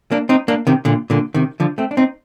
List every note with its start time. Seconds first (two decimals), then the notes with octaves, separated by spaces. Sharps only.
0.11 A#3 D4
0.29 C4 D#4
0.48 A#3 D4
0.67 C3 D#3
0.85 A#2 D3
1.10 A#2 D3
1.34 C3 D#3
1.60 D3 F3
1.78 A3 C4
1.91 D4
1.97 C4 D#4